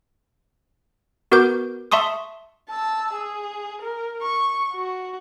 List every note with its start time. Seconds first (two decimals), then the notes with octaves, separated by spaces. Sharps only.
1.32 B3 F#4 A#4 B4 D6 G6
1.92 E5 A5 C6 C#6 D#6
2.69 A5 E6
3.13 G#4
3.82 A#4
4.22 C#6
4.73 F#4